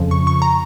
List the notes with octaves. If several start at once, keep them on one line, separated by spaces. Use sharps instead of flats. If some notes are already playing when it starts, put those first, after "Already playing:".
Already playing: F2 C#3 F3
C#6
C#6
A#5